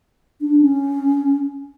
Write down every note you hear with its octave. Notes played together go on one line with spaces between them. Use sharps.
D4
C#4